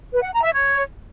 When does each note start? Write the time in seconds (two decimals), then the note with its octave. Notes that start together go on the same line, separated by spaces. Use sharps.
0.12 B4
0.22 F#5
0.33 A#5
0.43 E5
0.53 C#5